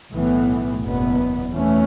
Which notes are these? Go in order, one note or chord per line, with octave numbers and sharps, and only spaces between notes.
B1 A2 E3 B3
F#1 E2 B2 B3
E2 E3 A3 C#4